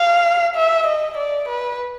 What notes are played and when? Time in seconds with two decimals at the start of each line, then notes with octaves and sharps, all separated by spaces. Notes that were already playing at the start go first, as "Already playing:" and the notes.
Already playing: F5
0.56 E5
0.86 D#5
1.17 D5
1.48 B4